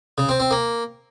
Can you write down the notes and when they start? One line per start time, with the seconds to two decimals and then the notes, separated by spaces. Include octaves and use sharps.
0.18 C#3
0.29 C4
0.40 C4
0.51 A#3